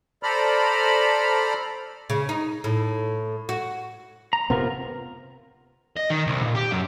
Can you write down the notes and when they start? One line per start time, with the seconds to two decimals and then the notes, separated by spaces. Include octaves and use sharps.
0.23 A4 C5 D5 A#5 B5 F6
2.10 C#3
2.29 D#4
2.64 A2
3.49 F#4
4.33 A#5
4.50 C3 B3 C4 F4 A#4
5.97 D#5
6.10 D#3
6.27 C2
6.43 A#2
6.55 G4
6.72 F#2